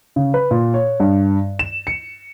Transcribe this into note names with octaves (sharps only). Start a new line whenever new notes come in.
C#3
B4
A#2
C#5
G2
E7
C#7